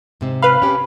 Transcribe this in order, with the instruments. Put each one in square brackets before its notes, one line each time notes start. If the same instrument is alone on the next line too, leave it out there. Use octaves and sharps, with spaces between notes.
[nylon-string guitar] G#2 C3 C4
[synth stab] B4 F5 [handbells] B5
[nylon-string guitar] C#4 G4